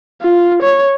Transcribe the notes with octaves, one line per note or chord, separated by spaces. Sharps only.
F4
C#5